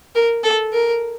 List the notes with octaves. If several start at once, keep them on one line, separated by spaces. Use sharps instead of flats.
A#4
A4
A#4